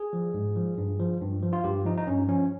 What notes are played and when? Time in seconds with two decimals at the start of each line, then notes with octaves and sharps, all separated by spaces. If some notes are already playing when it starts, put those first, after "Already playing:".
Already playing: G#4
0.13 F3
0.34 G#2
0.56 F3
0.78 G2
0.99 F3
1.21 G2
1.43 F3
1.53 F4
1.64 G2 G4
1.85 F3 D#4
1.97 D#4
2.07 G2 C#4
2.29 F3 C#4